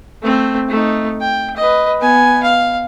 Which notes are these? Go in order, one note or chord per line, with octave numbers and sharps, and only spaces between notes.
A3 C4
A3 D#4
G5
B4 D#5
B3 G#5
F5